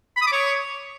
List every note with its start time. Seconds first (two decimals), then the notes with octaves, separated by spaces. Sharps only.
0.16 B5
0.22 D#6
0.27 D6
0.32 C#5